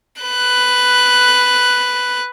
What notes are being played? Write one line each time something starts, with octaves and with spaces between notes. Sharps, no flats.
B4 F#6